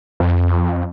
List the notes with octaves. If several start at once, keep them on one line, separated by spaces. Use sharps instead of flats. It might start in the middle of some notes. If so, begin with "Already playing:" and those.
F2